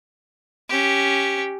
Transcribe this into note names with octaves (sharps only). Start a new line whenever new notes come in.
C#4 G4